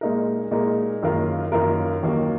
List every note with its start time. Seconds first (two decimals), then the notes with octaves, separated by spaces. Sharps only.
0.01 A#2 G#3 D#4 A#4
0.51 A#2 G#3 D#4 A#4
1.02 F#2 D#3 A#3 F4 A#4
1.52 F#2 D#3 A#3 F4 A#4
2.03 D#2 D#3 F#3 A#3